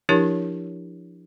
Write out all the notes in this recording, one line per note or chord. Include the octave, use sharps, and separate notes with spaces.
F3 D4 E4 G4 A#4 C#5